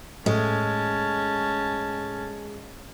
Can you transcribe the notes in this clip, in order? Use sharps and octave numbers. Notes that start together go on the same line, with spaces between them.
A2 G#3 C#4 A5